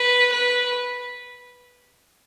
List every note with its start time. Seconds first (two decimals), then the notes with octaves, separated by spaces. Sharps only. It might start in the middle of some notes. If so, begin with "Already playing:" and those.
Already playing: B4
0.32 B4